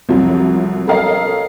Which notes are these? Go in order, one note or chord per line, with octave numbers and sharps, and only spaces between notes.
C2 F2 F3 F#3
A4 A#4 C#5 D#5 F5 A#5